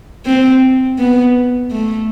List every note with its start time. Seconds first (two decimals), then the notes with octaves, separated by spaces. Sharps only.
0.26 C4
0.98 B3
1.71 A3